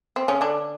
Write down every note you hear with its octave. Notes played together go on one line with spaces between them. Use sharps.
C4
C#3 C#4
D3 D4